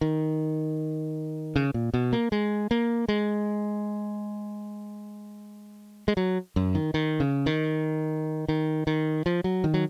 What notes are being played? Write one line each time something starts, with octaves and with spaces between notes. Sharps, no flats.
D#3
C#3
A#2
B2
A#3
G#3
A#3
G#3
G#3
F#3
F#2
D#3
D#3
C#3
D#3
D#3
D#3
F3
F#3
D#3
F#3